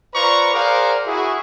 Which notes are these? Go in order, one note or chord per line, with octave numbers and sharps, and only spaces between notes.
F4 B4 C5 D5 A#5 C#6
G#4 A#4 C5 D5 F5 F#5
E4 F#4 G#4